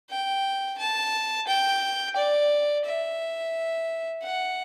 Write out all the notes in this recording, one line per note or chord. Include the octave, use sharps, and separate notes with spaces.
G5
A5
G5
D5
E5
F#5